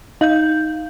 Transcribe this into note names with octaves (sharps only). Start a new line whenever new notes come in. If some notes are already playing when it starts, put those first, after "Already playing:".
D#4 F5 G6